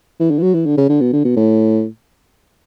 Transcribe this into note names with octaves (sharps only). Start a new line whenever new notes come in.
E3
D3
E3
F#3
E3
D3
C#3
D3
B2
D3
B2
A2